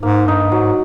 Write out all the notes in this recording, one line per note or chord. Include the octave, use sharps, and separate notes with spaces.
G#2 A#3
G2 D#4
G#2 F#3